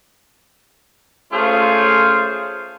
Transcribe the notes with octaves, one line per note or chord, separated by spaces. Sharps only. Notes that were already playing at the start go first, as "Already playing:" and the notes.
A3 C#4 F4 G#4 C5 F5